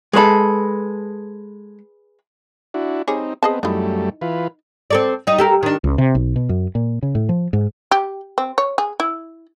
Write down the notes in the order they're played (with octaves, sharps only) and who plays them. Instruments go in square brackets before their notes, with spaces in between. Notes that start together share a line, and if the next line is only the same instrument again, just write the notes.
[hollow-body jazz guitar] G#3 A4 [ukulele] G#4 B4 B5
[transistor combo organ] D4 E4 F#4
[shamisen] G3 G#4 C#5 [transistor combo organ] C4 D#4
[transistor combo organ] B3 C4 [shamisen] G#4 D#5 A5
[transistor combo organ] F#2 G3 A3 [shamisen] D#4 E4
[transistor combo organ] E3 F4 B4
[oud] C4 A4 D5
G3 D#4
G4 A4 A#4
D#3 D4
[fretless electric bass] C#2
C3
B1
B2
F#2
A#2
C#3
A2
F3
G#2
[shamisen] G4
C4
C#5
G#4
E4